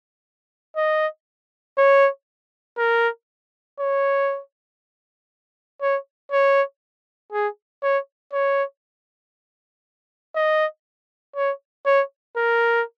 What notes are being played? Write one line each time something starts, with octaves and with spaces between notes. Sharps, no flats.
D#5
C#5
A#4
C#5
C#5
C#5
G#4
C#5
C#5
D#5
C#5
C#5
A#4